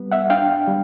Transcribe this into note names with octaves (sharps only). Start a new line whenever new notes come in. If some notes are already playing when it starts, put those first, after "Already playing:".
Already playing: G3 B3
E5 F#5
D4 F5 G5
G3